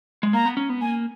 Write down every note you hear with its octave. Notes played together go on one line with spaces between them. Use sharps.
G#3
A#3 A#5
B3
C#4
B3
A#3 G#5